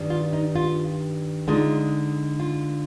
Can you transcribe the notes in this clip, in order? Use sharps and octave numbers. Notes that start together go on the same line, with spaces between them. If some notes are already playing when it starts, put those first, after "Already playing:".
Already playing: G2 D#3 G3 D4
F4
D#4
F4
D3 G#3 D#4 F4
F4